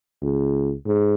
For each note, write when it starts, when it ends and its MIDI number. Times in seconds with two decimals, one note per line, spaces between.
0.22 0.74 37
0.86 1.15 44